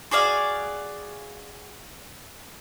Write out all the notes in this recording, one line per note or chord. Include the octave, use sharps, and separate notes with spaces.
F#4 G#4 D5 F5